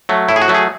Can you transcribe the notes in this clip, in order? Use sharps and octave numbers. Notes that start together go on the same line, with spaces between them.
F#3 A3
A2 E4
G#4
F#4
F#3 A3
G#4